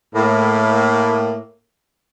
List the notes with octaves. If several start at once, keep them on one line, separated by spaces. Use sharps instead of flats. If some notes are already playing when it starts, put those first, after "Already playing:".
A2 A#3